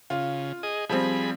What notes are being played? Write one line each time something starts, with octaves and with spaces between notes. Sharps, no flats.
C#3 F4
G#4 D#5
F3 G3 C4 G#4 B5